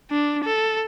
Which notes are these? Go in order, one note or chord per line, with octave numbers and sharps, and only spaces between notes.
D4
A4